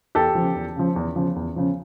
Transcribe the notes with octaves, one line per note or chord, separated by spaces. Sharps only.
E2 G4 A4
F3
C#3
E2
C#3 F3
E2
C#3 F3
E2
C#3 F3